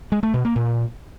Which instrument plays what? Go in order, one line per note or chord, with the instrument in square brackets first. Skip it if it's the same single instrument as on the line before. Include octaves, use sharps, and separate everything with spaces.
[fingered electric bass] G#3
A3
B2
A#3
A#2